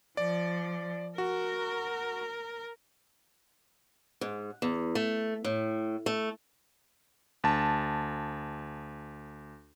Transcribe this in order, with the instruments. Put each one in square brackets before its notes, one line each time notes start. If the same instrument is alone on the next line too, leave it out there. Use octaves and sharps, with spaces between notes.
[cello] F3 [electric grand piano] D5
[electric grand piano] F#4 [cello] A#4
[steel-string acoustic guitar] G#2
E2
A3
A2
A3
[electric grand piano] D2 A5